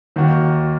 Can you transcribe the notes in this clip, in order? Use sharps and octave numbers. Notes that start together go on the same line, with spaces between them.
D#2 D#3 A#3 F#4 A#4